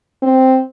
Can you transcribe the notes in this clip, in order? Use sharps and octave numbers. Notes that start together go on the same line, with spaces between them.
C4